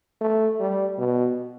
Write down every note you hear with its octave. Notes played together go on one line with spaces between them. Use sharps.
A3
G3
B2